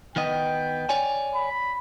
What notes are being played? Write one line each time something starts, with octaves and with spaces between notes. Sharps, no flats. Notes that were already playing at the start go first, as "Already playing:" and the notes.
D#3 B3 D#5 G5
C#5 D5 G#5
B5